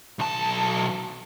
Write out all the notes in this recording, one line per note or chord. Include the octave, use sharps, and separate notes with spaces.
B1 A5